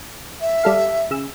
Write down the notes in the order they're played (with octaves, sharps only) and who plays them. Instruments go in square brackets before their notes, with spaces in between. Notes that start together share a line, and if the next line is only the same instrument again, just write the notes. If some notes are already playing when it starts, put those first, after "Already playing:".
[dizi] E5
[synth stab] G3 A4 F5
C#3 E6